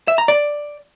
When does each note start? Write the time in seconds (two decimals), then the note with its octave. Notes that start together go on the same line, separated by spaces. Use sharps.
0.08 E5
0.18 A#5
0.28 D5